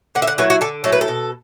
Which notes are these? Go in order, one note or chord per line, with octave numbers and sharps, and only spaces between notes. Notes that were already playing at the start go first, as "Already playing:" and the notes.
D3 F#5
E5
F#5
F#3 A3 E4 B4
F#4
D3 A4
F#3 A3 E4 A4
B4
A4
B2